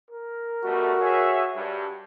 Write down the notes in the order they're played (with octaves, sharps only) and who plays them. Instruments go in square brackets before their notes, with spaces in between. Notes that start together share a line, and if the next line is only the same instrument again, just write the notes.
[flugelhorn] A#4
[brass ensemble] B2 G3 A3 [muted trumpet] F#4
[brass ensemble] G#4 C#5 E5
G2